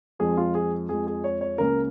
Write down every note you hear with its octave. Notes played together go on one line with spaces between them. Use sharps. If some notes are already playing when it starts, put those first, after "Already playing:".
F2 F3 G#3 G#4
F4
G#4
F2 F3 G#3 G#4
G#4
C#5
C#5
C#2 C#3 A#3 A#4